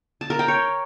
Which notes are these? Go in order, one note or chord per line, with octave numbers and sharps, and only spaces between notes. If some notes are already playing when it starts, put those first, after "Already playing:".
A5
A#4
G5
C#5